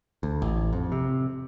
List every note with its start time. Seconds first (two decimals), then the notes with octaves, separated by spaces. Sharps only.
0.23 D2
0.42 A1
0.73 F2
0.92 C3